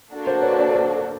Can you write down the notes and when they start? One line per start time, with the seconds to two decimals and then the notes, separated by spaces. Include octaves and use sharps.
0.11 A#3 D4 F#4 A4
0.27 A#4 C5
0.42 B4 C#5
0.58 C5 D5
0.75 C5 D5